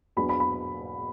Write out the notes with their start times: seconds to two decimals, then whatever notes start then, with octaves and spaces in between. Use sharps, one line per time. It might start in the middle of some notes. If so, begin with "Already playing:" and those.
0.17 E2 B2 F#3 B3 D4 B5
0.29 B5
0.40 B5